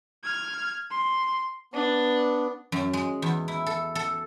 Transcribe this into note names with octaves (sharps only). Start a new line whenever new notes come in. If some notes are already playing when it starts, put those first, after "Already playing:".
F6 G#6
C6
B3 D4
F#2
G#3
E2
E4
A4
A4